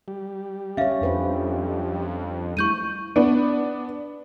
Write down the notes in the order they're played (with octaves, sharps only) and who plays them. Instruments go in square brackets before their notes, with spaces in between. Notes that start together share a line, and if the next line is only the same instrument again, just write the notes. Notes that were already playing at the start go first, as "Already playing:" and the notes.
[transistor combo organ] G3
[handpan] C#4 C#5 [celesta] E5 F5
[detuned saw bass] F2 [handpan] D4 B4 C5
[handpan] G3 A3 E4 [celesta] C#6 G6 D#7
[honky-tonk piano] B3 D4